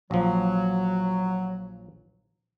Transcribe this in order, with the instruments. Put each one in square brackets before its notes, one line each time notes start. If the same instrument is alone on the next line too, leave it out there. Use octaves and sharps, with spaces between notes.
[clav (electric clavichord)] A#1 F3 [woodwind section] F#3